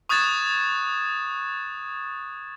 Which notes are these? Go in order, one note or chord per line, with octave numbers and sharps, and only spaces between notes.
C#6 D#6 F#6 G#6 A6 E7